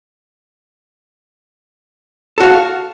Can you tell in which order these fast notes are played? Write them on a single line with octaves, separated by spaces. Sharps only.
A4 F#4 F5